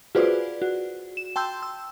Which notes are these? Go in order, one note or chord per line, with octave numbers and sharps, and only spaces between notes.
F4 F#4 G#4 B4 C5 D5
F#4
E7
G5 A5 C6 E6 G6
E6